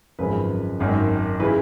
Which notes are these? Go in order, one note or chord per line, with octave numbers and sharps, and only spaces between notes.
G#1 F#2 C#3 F3 B4
G#1 F#2 D#3
C#3 E3 B4